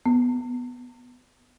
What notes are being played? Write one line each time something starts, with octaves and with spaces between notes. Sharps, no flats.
B3